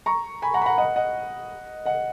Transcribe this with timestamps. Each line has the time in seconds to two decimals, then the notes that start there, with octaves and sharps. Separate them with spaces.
0.06 A#5 C#6
0.42 G#5 B5
0.54 F#5 A#5
0.62 B5
0.66 F#5 A#5
0.78 D#5 F#5
0.96 D#5 F#5
1.86 D#5 F#5